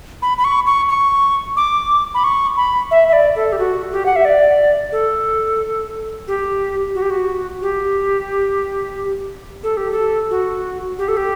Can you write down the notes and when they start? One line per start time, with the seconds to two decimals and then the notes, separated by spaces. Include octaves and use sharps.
0.22 B5
0.38 B5
0.44 C#6
0.66 C#6
0.89 C#6
1.57 D6
2.14 B5
2.24 C#6
2.57 B5
2.91 E5
3.08 E5
3.13 D5
3.36 A4
3.52 G4
3.58 F#4
3.92 G4
4.06 F#5
4.16 E5
4.25 D5
4.92 A4
6.28 G4
6.95 F#4
7.02 G4
7.10 F#4
7.62 G4
9.63 A4
9.77 G4
9.91 A4
10.31 F#4
10.99 G4
11.08 A4
11.17 G4